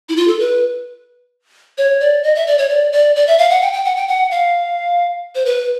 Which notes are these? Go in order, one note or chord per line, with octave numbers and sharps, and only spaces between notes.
E4
F4
A4
B4
C#5
D5
D#5
E5
D5
C#5
D5
D5
D5
E5
F5
F#5
G5
G5
F#5
G5
F#5
F5
C5
B4